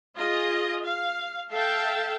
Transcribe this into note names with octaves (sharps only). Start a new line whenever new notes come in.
F4 G#4 D#5
F5
A4 E5 F5 G5 A5